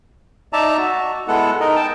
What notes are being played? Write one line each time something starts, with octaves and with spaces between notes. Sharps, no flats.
D#4 D5 E5 A5 A#5
F#4
G#3 B3 E4 A4 F#5
D#4 A#4 D#5
G5 A5